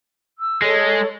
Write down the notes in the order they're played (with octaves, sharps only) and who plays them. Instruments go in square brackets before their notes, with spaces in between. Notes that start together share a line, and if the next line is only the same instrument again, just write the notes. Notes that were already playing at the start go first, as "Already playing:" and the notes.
[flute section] E6
[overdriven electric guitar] G#3 [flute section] A4 C#5